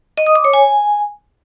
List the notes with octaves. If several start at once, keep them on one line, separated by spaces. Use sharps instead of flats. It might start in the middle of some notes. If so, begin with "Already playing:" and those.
D#5
D#6
D6
C#5
G#5